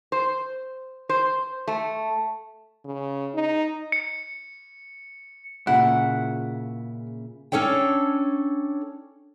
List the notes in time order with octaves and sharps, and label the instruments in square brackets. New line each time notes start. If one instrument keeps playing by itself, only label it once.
[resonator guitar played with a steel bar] C5
C5
A3
[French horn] C#3
D#4
[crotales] C#7
[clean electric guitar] A#2 C#3 E4 [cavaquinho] F#5
[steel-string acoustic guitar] C#4 D4 A4 C#5 G5